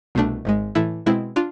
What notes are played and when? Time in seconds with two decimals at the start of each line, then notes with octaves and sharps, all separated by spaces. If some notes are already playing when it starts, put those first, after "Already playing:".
0.15 C2 B2 A3 D4
0.45 G#1 G#2 G#3
0.75 A2 E3 A3 E4
1.06 B2 G#3 C4 E4
1.36 D4 F4